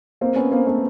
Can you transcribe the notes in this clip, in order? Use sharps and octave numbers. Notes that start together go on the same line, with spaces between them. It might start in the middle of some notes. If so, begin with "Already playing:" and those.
A#3 C4
B3 C#4
A#3 C4
A3 B3